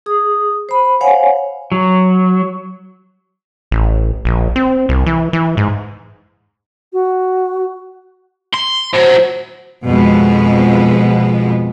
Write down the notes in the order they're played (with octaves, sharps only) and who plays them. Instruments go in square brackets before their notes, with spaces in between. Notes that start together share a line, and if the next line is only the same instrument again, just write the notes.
[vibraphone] G#4 D#6
C5 B5
C5 C#5 F5 F#5 G#5
[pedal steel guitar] F#3
[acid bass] A1
A#1
C4
C2
E3
E3
G#2
[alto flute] F#4
[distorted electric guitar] C6
[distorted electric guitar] A2 F#3 [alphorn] C5
[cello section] F2 B2 G#3 B3